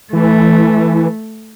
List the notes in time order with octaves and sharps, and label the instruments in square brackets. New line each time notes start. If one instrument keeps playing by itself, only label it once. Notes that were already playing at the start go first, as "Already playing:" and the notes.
[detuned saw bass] E3 [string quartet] A3